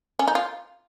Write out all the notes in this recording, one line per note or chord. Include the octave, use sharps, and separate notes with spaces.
C#4
D#4
F4